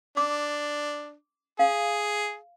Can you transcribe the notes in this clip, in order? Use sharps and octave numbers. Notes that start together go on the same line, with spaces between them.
D4 D6
G#4 F5